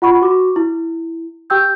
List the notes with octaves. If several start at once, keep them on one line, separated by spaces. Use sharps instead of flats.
F4 F#5 B5 C#6
F#4 C#6 D6
E4
G4 G5 E6 G6